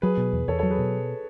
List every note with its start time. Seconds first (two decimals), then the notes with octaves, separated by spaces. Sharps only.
0.02 F#3 G#4 B4
0.17 B2
0.33 E2
0.48 E2 A4 C#5
0.59 F#3 A4 C#5
0.70 G#4 B4
0.79 B2